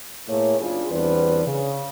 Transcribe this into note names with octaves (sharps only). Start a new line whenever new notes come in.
A2 A3 A#3 G#4 C#5
F#1 C#3 D4 F4 G#4
E2 G3 B3 C4 D4 B4
C#3